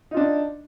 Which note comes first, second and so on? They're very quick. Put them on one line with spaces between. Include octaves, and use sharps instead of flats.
D#4 F4 D4